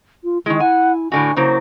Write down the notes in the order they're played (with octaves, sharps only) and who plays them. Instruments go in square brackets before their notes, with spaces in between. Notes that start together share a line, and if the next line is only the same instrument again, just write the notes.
[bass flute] F4
[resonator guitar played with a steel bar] D#3 G#3 [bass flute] E4
[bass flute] E4 [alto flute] F#5 [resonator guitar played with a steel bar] G#5
[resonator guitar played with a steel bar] A2 D3 F#4 [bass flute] D4 [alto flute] G#5
[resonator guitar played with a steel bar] C#3 F#3 A#3 [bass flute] E4 [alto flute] C5